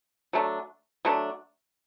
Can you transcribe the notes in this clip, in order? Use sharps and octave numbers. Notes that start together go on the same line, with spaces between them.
F#3 A3 D4
F#3 A3 D4